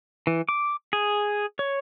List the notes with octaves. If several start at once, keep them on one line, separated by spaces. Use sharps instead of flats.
E3
D6
G#4
C#5